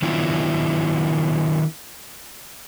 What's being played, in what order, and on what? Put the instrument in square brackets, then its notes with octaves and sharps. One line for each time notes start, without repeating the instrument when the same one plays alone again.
[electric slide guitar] D#3 F#3 B3 D4 E4 F4